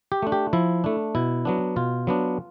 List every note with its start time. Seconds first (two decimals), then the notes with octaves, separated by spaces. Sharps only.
0.12 G4
0.22 A3 D4
0.32 G4
0.53 F3 E4
0.84 A3 D4
1.15 B2 E4
1.45 F#3 B3 D4
1.76 B2 F4
2.07 F#3 B3 D4